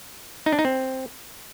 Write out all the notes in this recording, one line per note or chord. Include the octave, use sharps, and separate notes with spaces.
D#4
D4
D#4
C4